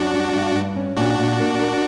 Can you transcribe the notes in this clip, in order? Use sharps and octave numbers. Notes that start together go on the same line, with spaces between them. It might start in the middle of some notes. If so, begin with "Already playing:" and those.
Already playing: F#2 D4 F#4
G3
G2
G2
C#4
A#2 D4 F#4
A#2
A#3
A#4